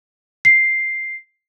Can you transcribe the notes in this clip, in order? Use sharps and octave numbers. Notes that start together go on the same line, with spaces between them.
C7